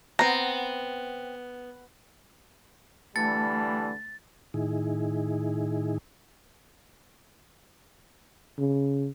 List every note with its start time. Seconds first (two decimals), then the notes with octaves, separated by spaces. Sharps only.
0.19 B3 C4 A#5
3.16 D3 E3 G3 A3 A6
4.54 A2 D#3 D#4 E4 G#4
8.58 C#3